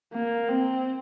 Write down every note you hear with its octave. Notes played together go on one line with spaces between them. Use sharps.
A#3
C4